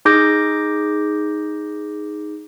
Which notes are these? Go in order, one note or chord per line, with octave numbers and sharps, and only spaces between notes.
D#4 G#4 D6 G6 A#6